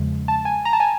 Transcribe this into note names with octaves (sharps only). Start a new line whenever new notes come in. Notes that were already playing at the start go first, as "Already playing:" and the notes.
Already playing: E2 C#3 F3 G#3
A5
G#5
A#5
A5
G#5